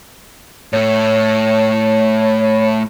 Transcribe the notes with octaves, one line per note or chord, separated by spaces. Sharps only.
A2 A3 C#5